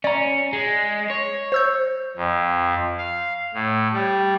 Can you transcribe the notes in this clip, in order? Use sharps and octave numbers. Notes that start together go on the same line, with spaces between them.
C#4 D5 A#5
G#3
C#5
C5 E6 G6
F2
F5
A2
G3